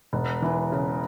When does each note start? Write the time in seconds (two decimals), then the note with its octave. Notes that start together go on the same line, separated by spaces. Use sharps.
0.13 E1
0.42 E3
0.72 C#3